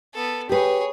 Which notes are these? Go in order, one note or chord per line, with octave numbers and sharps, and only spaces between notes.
B3 A4
G4 G#4 B4 C#5